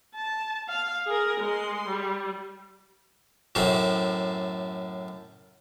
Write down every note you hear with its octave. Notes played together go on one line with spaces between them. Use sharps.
A5
F5
G#4 A#4
G#3 C6
G3
F#2 A2 A3 C4